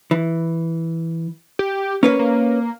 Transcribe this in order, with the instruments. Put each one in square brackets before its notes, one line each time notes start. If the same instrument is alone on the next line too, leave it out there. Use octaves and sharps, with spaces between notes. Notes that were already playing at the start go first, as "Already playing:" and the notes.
[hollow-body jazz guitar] E3
[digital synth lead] G4
[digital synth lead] A#3 [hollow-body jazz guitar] C#4 B4 C#5
[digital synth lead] A#3